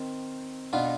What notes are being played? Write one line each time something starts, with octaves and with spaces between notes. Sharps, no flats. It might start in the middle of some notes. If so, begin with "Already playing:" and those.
Already playing: D#3 C4
B2 B3 D4 F4